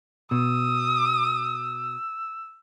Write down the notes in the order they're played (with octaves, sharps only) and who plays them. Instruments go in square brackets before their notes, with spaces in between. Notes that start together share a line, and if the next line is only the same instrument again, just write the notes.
[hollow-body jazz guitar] B2 [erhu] D#6 [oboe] E6